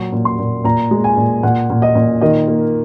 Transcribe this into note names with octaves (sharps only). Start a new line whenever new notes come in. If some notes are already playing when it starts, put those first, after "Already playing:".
Already playing: A#2 F#3 C#6
A#2
C6
A#2
A#2 A#5
G#3
G#5
A#2
A#2 F#5
A#2
D#5
A#2
D#3 D#5
A#3